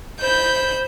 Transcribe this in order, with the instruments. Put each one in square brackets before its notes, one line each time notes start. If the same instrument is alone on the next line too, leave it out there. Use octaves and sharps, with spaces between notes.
[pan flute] C5 [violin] B5 G6